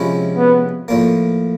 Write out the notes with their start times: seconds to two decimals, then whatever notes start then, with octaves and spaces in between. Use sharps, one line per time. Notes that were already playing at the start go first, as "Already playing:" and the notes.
Already playing: C3 F3 G#3 C#4 E4
0.37 B3
0.88 A2 F3 A#3